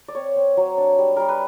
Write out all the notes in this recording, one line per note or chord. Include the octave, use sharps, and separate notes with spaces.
D5
C4 C#5
C4
F#3
D4
G3
G3 A#4
B4